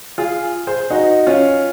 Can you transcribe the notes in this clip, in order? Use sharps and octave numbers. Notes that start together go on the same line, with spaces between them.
F4 G#4
G#4 C5
D#4 F#4
C#4 F4